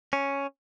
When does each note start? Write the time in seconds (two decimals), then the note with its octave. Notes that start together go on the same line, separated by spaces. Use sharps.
0.13 C#4